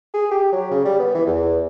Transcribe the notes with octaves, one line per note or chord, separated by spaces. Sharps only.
G#4
G4
F#3
C#3
G3
B3
E3
E2